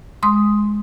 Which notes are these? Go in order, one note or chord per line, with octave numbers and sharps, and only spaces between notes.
G#3 C6 D#6